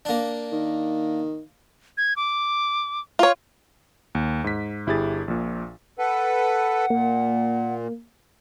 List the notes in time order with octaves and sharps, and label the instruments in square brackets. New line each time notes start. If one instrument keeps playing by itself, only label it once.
[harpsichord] A#3 D4
[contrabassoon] D#3
[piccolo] G#6
D6
[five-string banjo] F4 C#5
[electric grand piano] D#2
G#2 B6
G1 E4 G4 G#4 A6
A#1 A#2
[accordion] A4 B4 [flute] F#5
[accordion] A#2 [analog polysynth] A#3